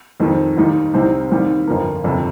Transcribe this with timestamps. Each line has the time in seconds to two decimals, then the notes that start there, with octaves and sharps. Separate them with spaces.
0.20 F2 D#3 G3 C4 D#4
0.57 D#2 D#3 G3 D#4
0.93 C2 C3 G3 C4 D#4
1.30 D#2 D#3 G3 C4
1.67 G1 F2 F3 A#3
2.04 G1 F2 C3